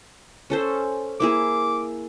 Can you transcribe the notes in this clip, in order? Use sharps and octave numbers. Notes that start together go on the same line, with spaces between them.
C#4 A4 C5
A#3 E4 G#4 D6